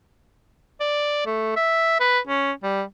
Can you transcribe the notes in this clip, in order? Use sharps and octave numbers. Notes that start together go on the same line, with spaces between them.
D5
A3
E5
B4
C#4
G3